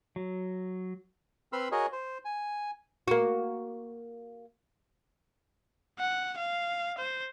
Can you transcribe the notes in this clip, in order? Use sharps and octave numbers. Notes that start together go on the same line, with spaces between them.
F#3
C4 B4 B5 C6 E6 F6
F#4 G#4 A#4 C#5 D#5
C5
G#5
A#3 F#4
F#5
F5
C5